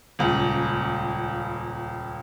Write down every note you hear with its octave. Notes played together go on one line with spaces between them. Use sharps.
D#1 C#2